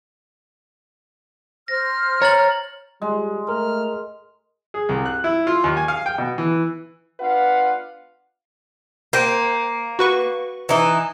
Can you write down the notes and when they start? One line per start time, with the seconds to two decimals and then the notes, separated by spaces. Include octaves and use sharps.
1.68 C5 F6 A#6
2.22 C#5 A#5 A6 F#7
3.02 G3 G#3
3.49 A3 A#4 F6
4.74 G#4
4.89 C2
5.06 F#6
5.24 E4
5.47 F4
5.64 D#2
5.77 G#5
5.88 F5
6.06 G5
6.18 B2
6.38 E3
7.20 B3 D4 F4 B4 F5 F#5
9.13 A#3 C5 G5
9.99 F#4 B4 C#6
10.69 E3 D#4